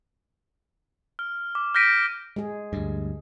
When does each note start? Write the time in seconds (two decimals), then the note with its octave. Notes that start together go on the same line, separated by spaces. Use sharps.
1.19 F6
1.55 D6
1.74 F6 G6 A#6 B6 D7 D#7
2.36 G#3 G#4
2.73 D2 G2